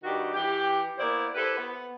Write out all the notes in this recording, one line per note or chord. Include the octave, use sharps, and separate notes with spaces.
G2 D#3 D4 F#4 G4
E3 G4
A#3 B3 E4 C5 D5
E4 G4 A4 B4 C5
B3